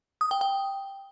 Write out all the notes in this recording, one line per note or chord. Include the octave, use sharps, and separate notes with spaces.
D#6
G5
G5